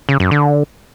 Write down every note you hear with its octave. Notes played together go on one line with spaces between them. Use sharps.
C#3
F#2
D3